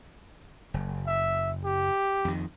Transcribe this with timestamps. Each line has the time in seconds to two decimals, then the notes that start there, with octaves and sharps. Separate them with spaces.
0.74 F#1
1.07 E5
1.65 G4
2.25 F2 D#3